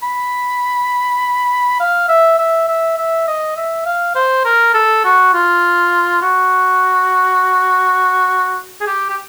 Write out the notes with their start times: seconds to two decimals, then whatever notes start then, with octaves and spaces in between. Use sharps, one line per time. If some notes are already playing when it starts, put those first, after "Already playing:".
0.03 B5
1.80 F5
2.09 E5
2.39 E5
2.68 E5
2.97 E5
3.28 D#5
3.56 E5
3.86 F5
4.15 C5
4.45 A#4
4.74 A4
5.04 F#4
5.33 F4
6.22 F#4
8.81 G#4
8.87 G4
9.10 G4